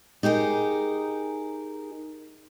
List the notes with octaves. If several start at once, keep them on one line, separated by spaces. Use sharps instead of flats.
D#4 G4 G#4 A#4